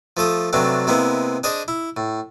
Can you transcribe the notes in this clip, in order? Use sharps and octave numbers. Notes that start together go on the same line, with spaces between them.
F3 A3 A4 D#6
G2 C3 F#3 A3 D4
C3 G#3 A#3 B3 E4
D4 G#4 C5 D#5
E4
A2